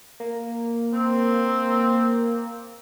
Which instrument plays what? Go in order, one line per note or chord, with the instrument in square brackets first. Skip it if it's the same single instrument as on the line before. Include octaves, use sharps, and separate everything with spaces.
[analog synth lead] A#3
[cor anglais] C4